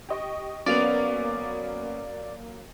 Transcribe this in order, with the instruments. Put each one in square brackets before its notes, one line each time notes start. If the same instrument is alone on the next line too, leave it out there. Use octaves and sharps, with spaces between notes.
[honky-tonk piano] G4 D#5 C#6
[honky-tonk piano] F#3 A#3 F7 [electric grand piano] B3 C#4 [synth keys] D5